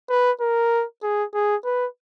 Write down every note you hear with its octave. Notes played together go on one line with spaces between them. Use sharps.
B4
A#4
G#4
G#4
B4